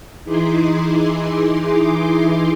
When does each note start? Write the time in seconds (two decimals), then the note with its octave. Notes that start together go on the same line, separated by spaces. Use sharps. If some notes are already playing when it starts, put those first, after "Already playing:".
0.25 E3 D#4 E4 G#4 C6 D6